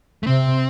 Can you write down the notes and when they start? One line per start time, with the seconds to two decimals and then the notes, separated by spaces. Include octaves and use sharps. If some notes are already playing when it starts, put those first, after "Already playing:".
0.23 A3
0.27 C3 C4